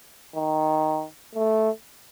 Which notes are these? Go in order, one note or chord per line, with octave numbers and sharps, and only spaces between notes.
D#3
A3